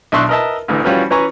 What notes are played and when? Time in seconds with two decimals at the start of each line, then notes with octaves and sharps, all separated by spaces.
0.12 B1 D4 E5 C6 C#6 F#6
0.29 A#4 B4 D#5 E5 A5
0.68 A1 D2 A2 D3 E3
0.84 E3 F3 G3 C#4 F4 F#4
1.10 E3 C#4 B4 G#5 A#5 C#6